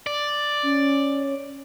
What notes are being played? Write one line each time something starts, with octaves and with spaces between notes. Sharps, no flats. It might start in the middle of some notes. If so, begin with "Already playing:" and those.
D5
C#4